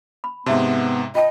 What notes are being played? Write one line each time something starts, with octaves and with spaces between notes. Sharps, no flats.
B5
G#2 C3 B3 E5 A5 C6
F4 D#5 G5 A5